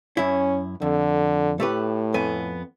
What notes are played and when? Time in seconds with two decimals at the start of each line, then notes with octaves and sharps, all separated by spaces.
0.17 F#2 C#4 E4
0.82 F2 D3
1.60 A2 A3 G4 B4
2.14 F2 B3 G#5